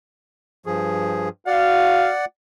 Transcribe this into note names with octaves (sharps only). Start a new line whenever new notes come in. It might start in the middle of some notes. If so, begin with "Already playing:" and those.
G2 F3 G#4
F#4 D5 F5 F#5